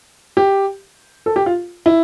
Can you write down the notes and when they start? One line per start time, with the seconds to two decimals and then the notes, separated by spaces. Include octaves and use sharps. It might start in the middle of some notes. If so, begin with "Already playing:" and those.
0.37 G4
1.26 A4
1.36 G4
1.46 F4
1.86 E4